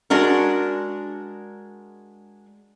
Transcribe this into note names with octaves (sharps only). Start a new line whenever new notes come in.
G#3 D4 F#4 A#4